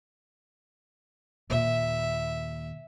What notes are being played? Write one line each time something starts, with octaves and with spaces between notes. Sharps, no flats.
D#2 A#2 E5